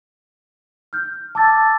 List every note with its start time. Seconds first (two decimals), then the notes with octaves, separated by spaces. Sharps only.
0.93 F6 G6
1.35 A5 D6 E6 A6